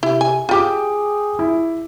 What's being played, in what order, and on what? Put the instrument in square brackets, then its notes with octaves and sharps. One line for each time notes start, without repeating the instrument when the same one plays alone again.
[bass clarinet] C3 [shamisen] E4
[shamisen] G#5
[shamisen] F4 G4 [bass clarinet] G#4 [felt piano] G5 D6
[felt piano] E4